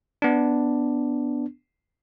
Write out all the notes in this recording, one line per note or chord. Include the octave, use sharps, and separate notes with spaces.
B3 D4